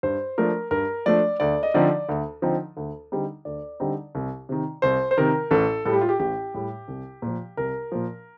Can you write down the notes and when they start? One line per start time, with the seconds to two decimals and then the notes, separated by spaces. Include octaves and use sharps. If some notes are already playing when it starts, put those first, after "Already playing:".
0.03 G2 C5
0.38 F3 A3 D4 A#4
0.71 G2 A#4
1.06 F3 A3 D4 D5
1.40 D2 D5
1.63 D#5
1.74 D3 F3 C4 D#4 D5
2.09 D2
2.42 D3 F3 C4 D#4
2.77 D2
3.12 D3 G3 C4 D#4
3.45 D2 D5
3.80 D3 G3 C4 D#4
4.15 C2
4.49 C3 D#3
4.82 C2 C5
5.11 C5
5.18 C3 D#3 A#4
5.51 A1 A4
5.85 A2 G3 A4
5.93 G4
6.01 F4
6.09 G4
6.19 A1 G4
6.54 A2 G3
6.88 C2
7.22 A#2 F3
7.57 C2 A#4
7.92 A#2 F3